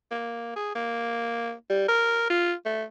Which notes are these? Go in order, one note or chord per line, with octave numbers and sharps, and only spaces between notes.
A#3
G#4
A#3
G3
A#4
F4
A3